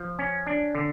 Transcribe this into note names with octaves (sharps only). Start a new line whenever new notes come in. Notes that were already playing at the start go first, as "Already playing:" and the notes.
Already playing: F3
C#4
D4
D3